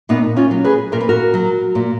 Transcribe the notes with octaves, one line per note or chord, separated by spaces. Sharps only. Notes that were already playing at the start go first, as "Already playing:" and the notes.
A#2 B3 D#4
C#4 F4
F#3
G#4 B4
A#2 A#4
B4
F#4 A#4
F#3
A#2